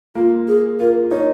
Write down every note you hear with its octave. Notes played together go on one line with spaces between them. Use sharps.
A#3 F4
G#4
F4 A#4
D#4 C#5